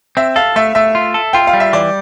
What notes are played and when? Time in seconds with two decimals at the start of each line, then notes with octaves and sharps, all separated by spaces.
0.17 C4 E5
0.36 A4 F5
0.56 A3 E5
0.75 A3 E5
0.95 F4
1.14 A4
1.33 F4 G5
1.47 F5
1.53 G3
1.60 E5
1.73 E3 D5